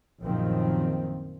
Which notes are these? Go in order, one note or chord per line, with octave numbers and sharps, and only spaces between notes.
A#1 F#2 D#3 F3 C4